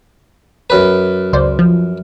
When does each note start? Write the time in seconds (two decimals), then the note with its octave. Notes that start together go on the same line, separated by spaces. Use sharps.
0.70 F#2 B4
1.33 C#2 C5 D5
1.59 F3